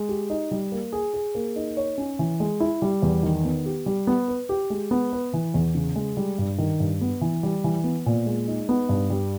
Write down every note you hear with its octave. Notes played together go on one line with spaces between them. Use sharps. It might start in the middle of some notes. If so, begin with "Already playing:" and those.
Already playing: G#3
G4
D#4
G3
A#3
G#4
G#4
A#3
D#4
C#5
C#4
E3
G#3
E4
G3
E2
D#3
B3
G4
G3
B3
B4
G4
G#3
B3
B4
E3
E2
C#3
G#3
G3
G2
D#3
G2
B3
E3
G3
E3
B3
A#2
G#3
D#4
B3
G2
G3